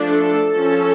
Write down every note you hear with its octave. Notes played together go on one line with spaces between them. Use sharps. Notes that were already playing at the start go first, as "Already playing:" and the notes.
Already playing: F3 A3 D4
A4
F3 C#4